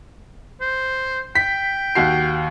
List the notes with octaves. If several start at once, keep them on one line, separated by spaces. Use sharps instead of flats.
C5
G5 B6
D#2 F#4 C7